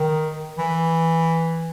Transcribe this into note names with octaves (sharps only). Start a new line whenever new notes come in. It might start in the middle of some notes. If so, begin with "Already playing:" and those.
Already playing: D#3
E3